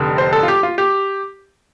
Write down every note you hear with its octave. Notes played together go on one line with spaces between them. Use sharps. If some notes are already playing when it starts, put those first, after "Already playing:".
Already playing: F1 F2 D3
C5
A4
F4
G4
F4
G4